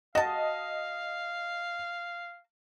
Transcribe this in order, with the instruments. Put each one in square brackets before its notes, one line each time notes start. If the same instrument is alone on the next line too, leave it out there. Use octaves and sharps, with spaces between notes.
[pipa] F#4 A5 [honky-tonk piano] D#5 [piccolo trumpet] F5